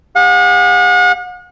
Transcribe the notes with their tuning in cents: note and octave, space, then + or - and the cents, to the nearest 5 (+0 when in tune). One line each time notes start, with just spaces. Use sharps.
G4 +35 F#5 -40